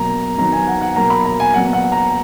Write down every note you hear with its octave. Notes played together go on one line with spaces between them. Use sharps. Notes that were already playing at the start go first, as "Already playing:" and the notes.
Already playing: B2 F#3 A#3 A#5
D#3 F#3 B3 A#5
G#5
F#5
F#5
B2 F#3 A#3 A#5
B5
A#5
G#5
A#2 F#3 B3 F#5
F#5
A#5